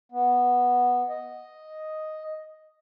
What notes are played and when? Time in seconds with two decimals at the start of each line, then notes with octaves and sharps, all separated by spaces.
0.12 B3
1.09 D#5